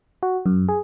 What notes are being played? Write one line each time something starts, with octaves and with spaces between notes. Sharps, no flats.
F#4
F#2
G#4